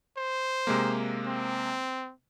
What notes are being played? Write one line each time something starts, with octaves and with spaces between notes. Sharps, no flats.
C5
C3 G#3 A#3
C4